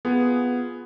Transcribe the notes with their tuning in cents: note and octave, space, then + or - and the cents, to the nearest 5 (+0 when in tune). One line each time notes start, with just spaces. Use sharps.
B3 +0 F4 +0 G#4 +0